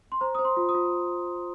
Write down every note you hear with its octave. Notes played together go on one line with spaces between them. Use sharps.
C6
C5 A#5
C5 D#6
C6
F4
D#6
F4